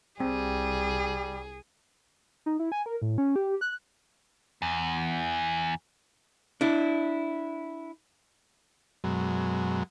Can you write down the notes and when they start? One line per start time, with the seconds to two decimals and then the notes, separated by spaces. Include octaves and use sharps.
0.20 C2 G3 C4 G#4
2.46 D#4
2.59 E4
2.72 G#5
2.86 A#4
3.02 A2
3.18 C#4
3.36 G4
3.61 F#6
4.62 E2
6.61 D4 E4
9.04 F#2 B2 F#3 G#3